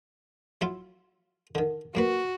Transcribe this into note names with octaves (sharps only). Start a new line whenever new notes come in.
F#3 E4 F4
D3 D#3
F#2 A#3 F#4 B4